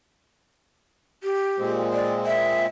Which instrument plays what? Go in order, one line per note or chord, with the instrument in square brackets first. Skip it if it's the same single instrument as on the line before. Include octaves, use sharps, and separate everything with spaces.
[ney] G4
[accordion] A#2 G#3 C4
[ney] D5
E5